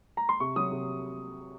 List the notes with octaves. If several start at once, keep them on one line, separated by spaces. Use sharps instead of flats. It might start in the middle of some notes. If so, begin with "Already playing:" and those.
A#5
C6
C3 C#6
F#3 D#6
C3